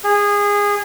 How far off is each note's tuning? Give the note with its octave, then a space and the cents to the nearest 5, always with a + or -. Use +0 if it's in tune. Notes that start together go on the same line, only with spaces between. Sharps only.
G#4 -20